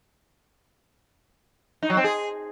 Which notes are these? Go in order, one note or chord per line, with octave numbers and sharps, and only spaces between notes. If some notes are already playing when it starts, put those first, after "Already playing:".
D#4
F#3
C4
G#4